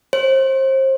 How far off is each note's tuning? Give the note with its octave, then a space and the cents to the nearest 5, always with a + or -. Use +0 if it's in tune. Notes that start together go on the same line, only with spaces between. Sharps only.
C5 +30